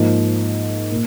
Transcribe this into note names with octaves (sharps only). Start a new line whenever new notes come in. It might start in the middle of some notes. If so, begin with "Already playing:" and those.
Already playing: G#2 F3 A#3
A#2